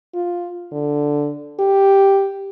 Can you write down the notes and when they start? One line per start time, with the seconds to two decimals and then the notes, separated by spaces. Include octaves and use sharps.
0.14 F4
0.72 D3
1.60 G4